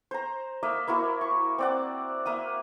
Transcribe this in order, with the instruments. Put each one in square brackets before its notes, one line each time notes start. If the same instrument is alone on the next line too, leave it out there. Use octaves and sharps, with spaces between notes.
[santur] C5 A#5
A#3 D#5 E5
A#3 E4 F#4 A#4
C#6
C4 D5 F#5
A#3 E5 D#6